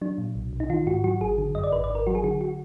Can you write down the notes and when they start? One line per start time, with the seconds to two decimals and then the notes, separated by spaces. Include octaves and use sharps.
0.01 F#3 D4
0.18 A#2
0.35 B1
0.53 B1
0.60 D#4
0.70 D#3 F4
0.87 G#2 F#4
1.04 F#3 F#4
1.21 G#1 G#4
1.38 D3
1.55 F#2 D#5
1.64 D5
1.72 G#1 B4
1.84 D5
1.90 G#1
1.95 A#4
2.07 F#3 F#4
2.15 G#4
2.24 D3 F#4
2.41 F#4